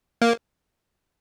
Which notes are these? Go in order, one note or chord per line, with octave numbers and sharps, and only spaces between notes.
A#3